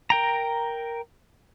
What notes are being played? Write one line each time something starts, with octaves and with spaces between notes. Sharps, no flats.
A#4 G5 A#5